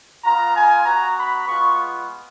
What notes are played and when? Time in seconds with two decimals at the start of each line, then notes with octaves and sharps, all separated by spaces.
0.24 B3 F4 A#5
0.54 G#5
0.85 B3 F#4 A#5
1.16 B5
1.46 G#3 B3 F4 C#6